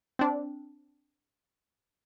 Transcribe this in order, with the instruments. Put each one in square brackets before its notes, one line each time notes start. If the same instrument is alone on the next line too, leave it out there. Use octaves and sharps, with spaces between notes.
[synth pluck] C4 D4